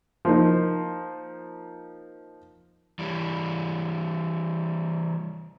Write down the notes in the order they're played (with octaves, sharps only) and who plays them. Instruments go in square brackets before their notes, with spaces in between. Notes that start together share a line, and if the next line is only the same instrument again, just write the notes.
[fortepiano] F3 A#3 D#4
[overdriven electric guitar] E3 G3